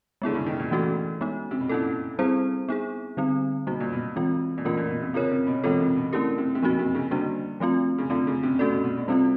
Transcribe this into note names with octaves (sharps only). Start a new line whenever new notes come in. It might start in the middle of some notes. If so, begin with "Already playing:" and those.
D3 G#3 B3 E4 G#4
C#3
D#3
A#2
E3 A3 C#4 F#4 A4
G#3 B3 D#4
C3
B2
A#2 C#4 E4 A4
G3 C4 E4 G#4 C5
B3 D#4 G#4
D3 G3 C4 D#4
B2 G3 A#3 D#4 F#4
A#2
B2
E3 G#3 C4 F4
A#2
B2 E3 A3 C#4 F4 A#4
A#2
B2
C3
C#3 C4 F4 A#4 C#5
C3
B2
B2 E3 G#3 C4 F4 A4
C3
B2
C3 A3 C#4 E4 G4 A#4
C3
C3
B2 F3 A#3 D#4 F#4
C3
C#3
D3 G3 A#3 D4 F#4
F3 A3 C4 F4
C#3
D3 A3 C4 F4
C#3
C3
C3 A3 C#4 F#4 A4 D5
B2
B2
B2
C3 G3 C4 F4